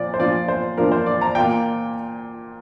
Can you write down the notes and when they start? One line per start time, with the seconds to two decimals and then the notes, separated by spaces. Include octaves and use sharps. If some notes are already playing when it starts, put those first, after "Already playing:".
Already playing: A#2 F3 F4 D5
0.14 C5
0.20 A#2 F3 D4 F4 D5
0.48 C5
0.77 A#2 F3 D4 F4 A#4
0.92 C5
1.06 D5
1.21 A#5
1.35 A#2 A#3 F4 G5